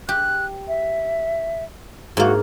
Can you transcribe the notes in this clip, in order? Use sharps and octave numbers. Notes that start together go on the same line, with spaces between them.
G4 F#6
E5
G#2 A#3 F#4